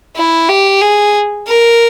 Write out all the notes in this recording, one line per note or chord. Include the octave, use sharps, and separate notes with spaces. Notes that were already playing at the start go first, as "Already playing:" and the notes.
E4
G4
G#4
A#4